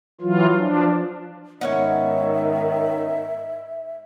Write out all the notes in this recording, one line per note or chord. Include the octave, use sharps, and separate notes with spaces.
E3 F#3 F4
F3 D4
G#2 D#3 B3 C#4 D#4 C#5 E5